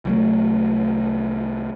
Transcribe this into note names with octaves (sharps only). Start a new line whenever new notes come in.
C2 F#3 A3